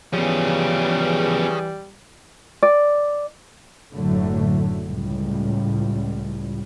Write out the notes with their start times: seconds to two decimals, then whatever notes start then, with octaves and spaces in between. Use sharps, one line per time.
0.13 E3 F3 G3 B3 G#4 C#5
2.63 D5
3.94 F#1 A2 D3 F#3 A3
4.82 C#2 A2 G3